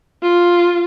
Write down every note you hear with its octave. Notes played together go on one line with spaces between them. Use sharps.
F4